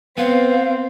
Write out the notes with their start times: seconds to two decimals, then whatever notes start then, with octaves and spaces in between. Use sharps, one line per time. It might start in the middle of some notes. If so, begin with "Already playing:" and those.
0.18 B3 C4 F5